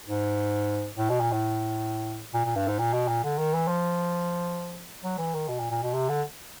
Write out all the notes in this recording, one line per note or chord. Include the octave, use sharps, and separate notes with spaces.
G#2
A2
B2
A#2
A2
A#2
A#2
G2
G#2
A#2
B2
A#2
D3
D#3
E3
F3
F#3
E3
D#3
B2
A#2
A#2
B2
C3
D3